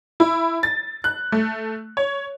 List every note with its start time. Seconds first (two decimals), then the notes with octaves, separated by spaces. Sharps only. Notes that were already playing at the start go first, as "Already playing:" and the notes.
0.20 E4
0.63 A6
1.04 F#6
1.32 A3
1.97 C#5